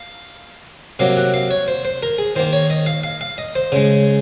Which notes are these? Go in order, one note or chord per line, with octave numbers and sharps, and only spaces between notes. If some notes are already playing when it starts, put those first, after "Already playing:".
Already playing: F5
C3 F#3 A#3 F5
F#5
F5
C#5
C5
C5
A#4
G#4
D#3 A#3 C5
C#5
D#5
F5
F5
F5
D#5
C5
C#3 G#3